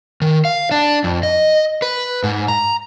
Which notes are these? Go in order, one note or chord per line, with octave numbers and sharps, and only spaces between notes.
D#3
F5
D4
F2
D#5
B4
G#2
A#5